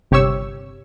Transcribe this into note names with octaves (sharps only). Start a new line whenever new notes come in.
G1 C3 G4 C#5 C#6 E6